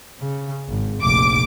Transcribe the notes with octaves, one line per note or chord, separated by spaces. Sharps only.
C#3
G#1
F1 A#1 D6